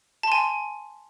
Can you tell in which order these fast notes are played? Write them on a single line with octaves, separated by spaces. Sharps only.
A5 C6 G#5